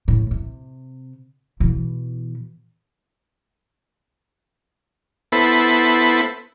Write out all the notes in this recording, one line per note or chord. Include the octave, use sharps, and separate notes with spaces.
A2
C3
B2 E3
B3 E4 A4 C5 B5